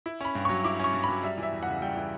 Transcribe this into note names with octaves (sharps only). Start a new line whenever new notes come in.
E4
C#4 B5
G2
C#6
F#3
E4 D6
C#4 C#6
G2
B5
F#3
G3 E5
E3 E5
E2
F#5
C#3
G3 G5
E3